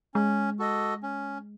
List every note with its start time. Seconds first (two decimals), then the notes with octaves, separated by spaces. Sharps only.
0.14 G#3 C#4
0.59 F#4 A4 D#5
1.03 C#4